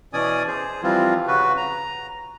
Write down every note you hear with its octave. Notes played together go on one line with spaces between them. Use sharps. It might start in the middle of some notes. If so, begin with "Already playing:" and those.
B2 E3 C#4 D5 G#5 D#6
G#4 C5
E3 F3 G3 C4 F4
C#3 F#4 B4
A#5